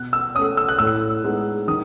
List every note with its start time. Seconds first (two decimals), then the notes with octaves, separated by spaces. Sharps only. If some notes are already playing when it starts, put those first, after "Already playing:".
Already playing: B2 F#6
0.13 E6
0.35 A3 C#4 D#6
0.57 E6
0.69 F#6
0.79 A2 E6
1.24 G#3 B3 D#4
1.68 D#3 D#6